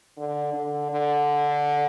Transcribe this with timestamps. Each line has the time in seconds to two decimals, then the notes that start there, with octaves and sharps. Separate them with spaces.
0.17 D3
0.54 D3
0.91 D3